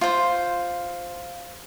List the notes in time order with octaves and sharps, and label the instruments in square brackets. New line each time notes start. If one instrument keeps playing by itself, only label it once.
[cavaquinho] F4 C5